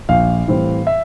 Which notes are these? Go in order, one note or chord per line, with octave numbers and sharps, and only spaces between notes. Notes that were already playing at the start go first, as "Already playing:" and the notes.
A#1 F5
A2 E3 G3 C4
E5